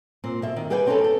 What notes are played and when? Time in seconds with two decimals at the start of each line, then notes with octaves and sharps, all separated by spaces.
0.24 A#2 C4
0.42 B2 E5
0.56 D#3
0.70 G3 G#4 B4 D5 G5 G#5
0.87 C4 C#4 D#4 G4 A4 B4
1.04 A4